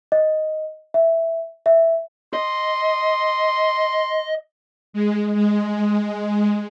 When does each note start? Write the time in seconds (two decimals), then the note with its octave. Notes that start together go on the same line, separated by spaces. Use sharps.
0.12 D#5
0.94 E5
1.66 E5
2.33 D#5 C6
4.93 G#3
5.34 G#3